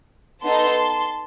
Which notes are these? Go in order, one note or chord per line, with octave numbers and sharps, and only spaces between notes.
B3 D#4 A4 A5 C6